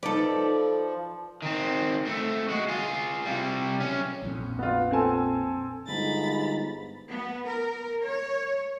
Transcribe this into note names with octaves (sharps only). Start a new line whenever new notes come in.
F3 D#4 A4 B4 D5
D#3 C4
A3 C4
G#3 F#4
F4 G#4
C3 G3
B1 C#4
A#1 F2
B3 F4
C4 A4 G#5
G1 G#2 A#5 B5 A6
B3
A#4
C#5